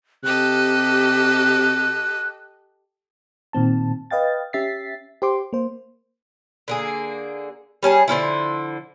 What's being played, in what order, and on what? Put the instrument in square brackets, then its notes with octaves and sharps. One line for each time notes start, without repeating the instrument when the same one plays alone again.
[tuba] C3 [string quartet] G4 A4 D#5 [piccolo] F#6
[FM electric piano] A#2 D#3 C4 A5
B4 D#5 F5 G5 A6
C#4 G4 E5 A6 B6 C7
G4 C5 C6 D6
A#3 C5
[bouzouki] D3 A#3 G#4
G3 C#4 G#4 A5
D3 F3 C#4 E4